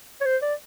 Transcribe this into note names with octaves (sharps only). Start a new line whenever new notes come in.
C#5
C5
D5